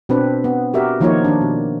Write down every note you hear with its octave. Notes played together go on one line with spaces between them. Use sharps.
B2 C4 D4 B4
B3
F#4 G4 A#4 E5
D#3 F3 A#3 D#4 F4 C#5
D#3 D4
B2